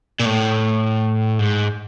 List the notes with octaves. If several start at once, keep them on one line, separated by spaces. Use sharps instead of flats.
A#2
A2
G#2